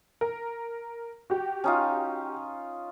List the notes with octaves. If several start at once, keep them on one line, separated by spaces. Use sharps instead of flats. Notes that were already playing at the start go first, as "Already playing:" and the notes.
A#4
F#4 G4
C#4 D#4 F4